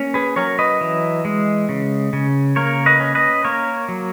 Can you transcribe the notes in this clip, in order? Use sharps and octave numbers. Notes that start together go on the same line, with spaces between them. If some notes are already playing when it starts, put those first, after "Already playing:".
Already playing: A#3 C#4
G#4 B4
F#3 A#4 C#5
B4 D#5
E3
G#3
C#3
C#3
A#3 A#4 C#5
B4 D#5
C#4
B4 D#5
A#3 A#4 C#5
F#3